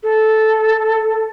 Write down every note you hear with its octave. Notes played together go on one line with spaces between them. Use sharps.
A4